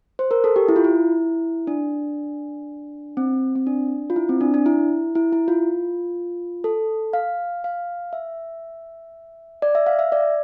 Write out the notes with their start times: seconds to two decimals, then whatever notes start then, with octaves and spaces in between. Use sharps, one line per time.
0.19 C5
0.31 A#4
0.44 A4
0.56 G4
0.69 E4
0.76 F4
0.84 E4
1.67 D4
3.17 C4
3.56 C4
3.67 D4
4.10 F4
4.16 E4
4.29 C4
4.41 D4
4.54 D4
4.66 E4
5.15 E4
5.33 E4
5.48 F4
6.64 A4
7.13 F5
7.64 F5
8.13 E5
9.62 D5
9.75 E5
9.87 F5
9.99 E5
10.12 D5